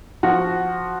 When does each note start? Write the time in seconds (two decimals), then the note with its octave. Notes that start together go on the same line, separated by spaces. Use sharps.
0.23 F3 F#4